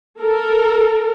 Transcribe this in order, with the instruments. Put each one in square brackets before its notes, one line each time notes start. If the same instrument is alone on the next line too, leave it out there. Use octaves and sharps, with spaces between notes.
[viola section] A4 A#4